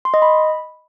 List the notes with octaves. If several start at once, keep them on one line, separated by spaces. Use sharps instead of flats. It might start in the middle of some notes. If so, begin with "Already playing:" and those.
C6
D#5
B5